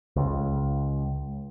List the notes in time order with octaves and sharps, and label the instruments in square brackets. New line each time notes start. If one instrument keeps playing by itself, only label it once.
[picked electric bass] C#2